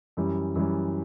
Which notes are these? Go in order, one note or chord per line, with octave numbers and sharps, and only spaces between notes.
F#2 E3 G3
F#2 E3 G3